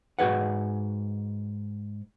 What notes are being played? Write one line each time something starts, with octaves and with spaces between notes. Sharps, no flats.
G#2 F#4 G#4 B4 F#5